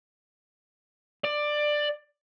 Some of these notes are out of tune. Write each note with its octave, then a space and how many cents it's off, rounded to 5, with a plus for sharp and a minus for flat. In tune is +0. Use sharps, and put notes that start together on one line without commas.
D5 +15